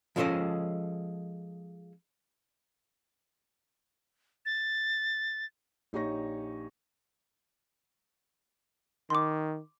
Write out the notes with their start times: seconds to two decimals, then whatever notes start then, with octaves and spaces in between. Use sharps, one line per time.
0.16 F3 G#3 C#4 A4 C5 D#5
4.46 A6
5.93 A#1 D#4 G4 C#5 C#6 A#6
9.10 D#3 C6 D6